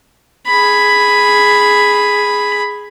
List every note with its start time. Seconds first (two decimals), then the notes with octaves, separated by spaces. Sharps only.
0.47 G#4 B5